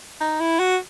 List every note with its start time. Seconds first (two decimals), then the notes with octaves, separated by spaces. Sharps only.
0.21 D#4
0.40 E4
0.60 F#4